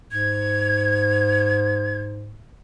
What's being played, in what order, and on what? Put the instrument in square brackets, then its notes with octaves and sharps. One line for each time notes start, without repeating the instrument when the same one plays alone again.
[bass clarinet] G#2 [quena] G#6